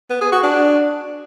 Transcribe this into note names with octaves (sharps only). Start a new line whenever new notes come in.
B3
G#4
F#4
D4